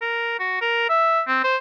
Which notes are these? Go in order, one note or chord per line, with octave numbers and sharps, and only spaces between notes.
A#4
F#4
A#4
E5
C4
C5